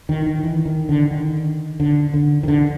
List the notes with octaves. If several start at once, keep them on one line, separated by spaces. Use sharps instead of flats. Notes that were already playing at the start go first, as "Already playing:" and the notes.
D#3
D#3
E3
D#3
D3
D#3
D3
D3
D#3
D3